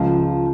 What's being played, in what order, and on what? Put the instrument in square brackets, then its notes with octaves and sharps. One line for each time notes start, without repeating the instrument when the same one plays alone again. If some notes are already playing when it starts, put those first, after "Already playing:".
Already playing: [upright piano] C#2 [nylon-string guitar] F3